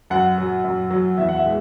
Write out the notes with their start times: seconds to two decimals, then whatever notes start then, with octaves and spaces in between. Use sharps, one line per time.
0.10 F#2 F#5
0.38 F#3
0.64 F#2
0.91 F#3
1.18 E2 E5
1.29 F#5
1.36 E5
1.44 E3 G#3